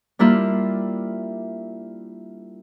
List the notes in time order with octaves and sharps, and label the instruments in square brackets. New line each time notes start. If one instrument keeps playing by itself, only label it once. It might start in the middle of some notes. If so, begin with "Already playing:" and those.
[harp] G3 A#3 D4 E4 F4